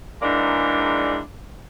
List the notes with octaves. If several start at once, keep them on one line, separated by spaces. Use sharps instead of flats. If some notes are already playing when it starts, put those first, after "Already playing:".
G#2 E3 G#3 A#3 D4 D5